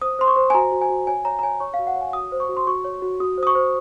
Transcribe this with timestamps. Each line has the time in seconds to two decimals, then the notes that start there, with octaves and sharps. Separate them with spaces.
0.01 C5 D#6
0.19 C5 C6
0.28 C#6
0.36 C5
0.50 G#5
0.54 F#4 A#5
0.72 F#4
0.82 G#5
0.90 F#4
1.07 C#5 G#5
1.25 C#5 A#5
1.39 A#5
1.43 C#5 G#5
1.60 C#5 C#6
1.74 F5
1.79 F#4
1.87 F#5
1.96 C#5
2.01 G#5
2.13 F#4 D#6
2.32 C5
2.40 C#6
2.49 F#4
2.57 C6
2.67 F#4 C#6
2.84 C#5
3.02 F#4
3.20 F#4 D#6
3.38 C5
3.43 D#6
3.47 C#6
3.55 C5